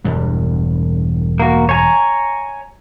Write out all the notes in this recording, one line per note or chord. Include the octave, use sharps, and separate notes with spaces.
E1 E2 G2
A#3 F#4
C#5 G#5 A#5